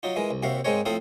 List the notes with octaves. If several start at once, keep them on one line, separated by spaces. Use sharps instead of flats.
F#3 D#4 F4
E3 G#3 A#4
C2
D#2 C3 F#4 E5 F5
G#2 G#3 C4 A#4 C#5
A2 F3 C4 A4 F5 D#6